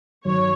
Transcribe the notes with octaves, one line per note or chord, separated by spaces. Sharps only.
G2 D#3 F#3 C#5